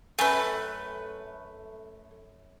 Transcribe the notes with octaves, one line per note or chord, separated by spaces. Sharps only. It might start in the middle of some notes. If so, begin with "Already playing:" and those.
F#2 A3 B4 G5 G#5